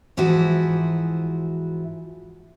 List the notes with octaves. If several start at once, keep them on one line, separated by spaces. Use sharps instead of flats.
G#2 E3 F3 E4 F#4 G#4